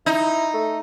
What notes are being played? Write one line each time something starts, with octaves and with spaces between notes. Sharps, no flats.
D#4 E4
A3